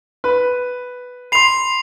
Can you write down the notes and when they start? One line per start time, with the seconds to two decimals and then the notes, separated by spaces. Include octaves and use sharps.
0.24 B4
1.32 B5 C6 C7 F7